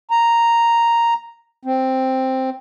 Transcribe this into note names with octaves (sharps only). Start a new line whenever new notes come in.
A#5
C4